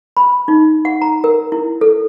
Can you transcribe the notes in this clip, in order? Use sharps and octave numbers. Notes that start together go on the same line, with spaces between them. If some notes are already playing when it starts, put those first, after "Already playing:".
B5
D#4
F#5
A#5
A#4
E4
A4